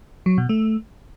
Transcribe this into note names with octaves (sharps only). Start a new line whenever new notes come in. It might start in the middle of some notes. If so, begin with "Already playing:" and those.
F#3
B2
A3